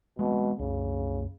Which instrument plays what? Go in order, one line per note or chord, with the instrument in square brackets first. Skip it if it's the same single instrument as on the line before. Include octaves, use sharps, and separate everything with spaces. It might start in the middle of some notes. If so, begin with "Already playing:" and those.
[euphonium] B2 [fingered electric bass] G#3 B3 C4
[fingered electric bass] C2 F#2 [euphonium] C#3